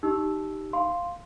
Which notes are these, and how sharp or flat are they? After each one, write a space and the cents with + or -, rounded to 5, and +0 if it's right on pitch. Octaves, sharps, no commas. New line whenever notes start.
D#4 +0 G4 -10 E6 +0
F5 +0 C6 +0